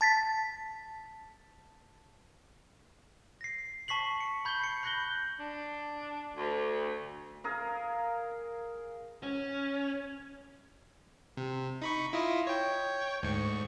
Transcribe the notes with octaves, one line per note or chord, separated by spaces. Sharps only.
A5 A6 B6
A#6 C7
A5 C#6 B6 C7 F#7
C#7
B5 G6 G#6 F#7 G7
C7 C#7
B5 F#6 G6 A#6 F#7 G7
D4
D2
G#4 A#4 F5
C#4
C3
D#4 B5 C#6
E4 F4 D#5
C#5 G5
D2 G#2 C#6